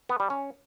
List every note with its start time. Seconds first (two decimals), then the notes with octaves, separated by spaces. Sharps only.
0.09 B3
0.20 G3
0.30 C#4